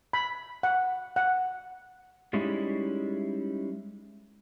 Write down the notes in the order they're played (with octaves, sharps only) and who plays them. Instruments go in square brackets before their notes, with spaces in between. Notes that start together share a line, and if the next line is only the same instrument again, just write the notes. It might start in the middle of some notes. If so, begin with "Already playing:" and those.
[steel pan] B5
F#5
F#5
[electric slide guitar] G3 G#3 C#4 D#4 E4